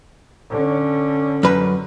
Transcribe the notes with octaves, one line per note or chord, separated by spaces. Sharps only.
D3 C#4
F#2 B4